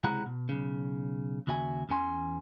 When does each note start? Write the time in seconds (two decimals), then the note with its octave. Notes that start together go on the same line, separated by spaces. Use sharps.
0.04 C#2 C3 G#3 E4 F#5 A#5
0.26 B2
0.49 B1 C#3
1.47 D#2 C#3 F#4 E5 G#5
1.89 E2 E3 C#4 G#5 C6